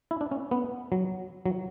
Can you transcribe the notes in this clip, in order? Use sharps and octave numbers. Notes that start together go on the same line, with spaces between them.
E4
D4
C#4
B3
F#3
F#3